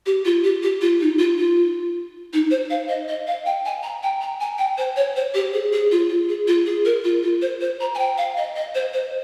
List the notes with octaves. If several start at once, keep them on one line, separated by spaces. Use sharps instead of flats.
G4
F4
G4
G4
F4
D#4
F4
F4
D#4
C5
F5
D#5
D#5
F5
G5
G#5
A#5
G5
A#5
G#5
G5
C5
C#5
C5
G4
G#4
G#4
F4
F4
G#4
F4
G#4
A#4
F4
F4
C5
C5
A#5
G#5
G5
F5
D#5
D#5
C5
C5